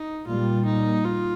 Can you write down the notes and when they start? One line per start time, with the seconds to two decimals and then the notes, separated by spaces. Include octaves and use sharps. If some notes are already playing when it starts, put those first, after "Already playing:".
Already playing: D#4
0.27 A#2 G3 A#3 F4
0.66 D#4
1.05 F4